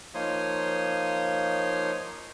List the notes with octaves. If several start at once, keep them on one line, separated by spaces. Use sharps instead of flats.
F3 A#3 D#4 C#5 C6 D#6